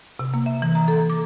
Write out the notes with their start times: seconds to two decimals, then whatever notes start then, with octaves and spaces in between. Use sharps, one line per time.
0.19 C3
0.34 A#3
0.46 E5
0.62 E3
0.75 A#5
0.88 A4
1.10 D6